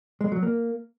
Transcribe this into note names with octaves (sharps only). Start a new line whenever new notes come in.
G#3
F#3
A#3